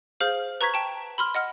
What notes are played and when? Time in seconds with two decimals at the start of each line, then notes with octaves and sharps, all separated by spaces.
0.21 G#4 C5 F5 F6 G6
0.61 B4 A#5 C#6 G#6 B6
0.74 G5 A5
1.18 B5 C6 F6
1.35 D#5 F#5 F6